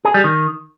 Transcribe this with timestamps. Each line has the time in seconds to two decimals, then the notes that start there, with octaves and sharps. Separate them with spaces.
0.05 G#4
0.14 G3
0.24 D#3